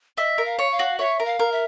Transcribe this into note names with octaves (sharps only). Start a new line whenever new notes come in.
D#5 E5
A#4
F5
C#5
F5
F#4
C#5 E5
A#4
F5
A#4
E5